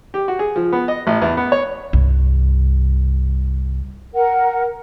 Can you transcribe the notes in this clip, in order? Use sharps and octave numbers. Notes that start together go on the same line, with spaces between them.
G4
F#4
G#4
F3
B3
D#5
A1
E2
B3
C#5
C2 G2
A#4 F#5